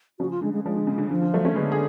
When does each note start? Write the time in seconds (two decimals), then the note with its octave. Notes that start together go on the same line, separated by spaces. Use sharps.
0.19 C#3 F3 F#4
0.31 F4
0.42 D3 G#3
0.53 G#3
0.65 F3 G#3
0.76 D3
0.87 C#3
0.98 D3
1.11 D3 F3
1.21 D3
1.34 F#3 A3
1.45 A3 C#4
1.55 D3 G#3 B3
1.72 G#4